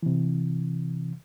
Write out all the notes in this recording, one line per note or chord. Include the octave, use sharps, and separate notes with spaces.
C3 E3